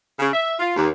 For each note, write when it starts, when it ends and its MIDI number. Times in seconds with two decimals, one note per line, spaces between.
0.19 0.29 49
0.33 0.55 76
0.59 0.73 65
0.76 0.90 39